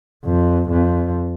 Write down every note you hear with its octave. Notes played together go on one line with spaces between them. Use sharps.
F2
F2